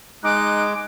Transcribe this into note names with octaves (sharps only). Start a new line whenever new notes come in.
G#3 D#4 D6 F#6